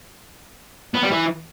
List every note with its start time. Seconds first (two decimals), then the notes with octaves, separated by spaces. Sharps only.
0.94 B3
1.02 G3
1.11 E3